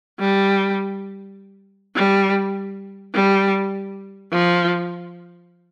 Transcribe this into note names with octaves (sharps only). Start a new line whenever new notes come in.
G3
G3
G3
F3